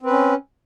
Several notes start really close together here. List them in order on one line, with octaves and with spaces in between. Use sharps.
C4 B4 C#4